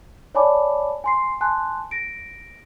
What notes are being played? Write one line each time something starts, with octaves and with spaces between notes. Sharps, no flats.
C#5 D5 G#5 A5 B5 D6
G#5 C6 C7
G#5 A5 C6 F#6
A#6 D7